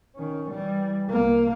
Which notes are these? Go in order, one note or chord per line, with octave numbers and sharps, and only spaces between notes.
D#3 C#4
E3 G3
C2 A#3